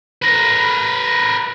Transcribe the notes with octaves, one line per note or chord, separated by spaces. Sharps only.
A#4 B4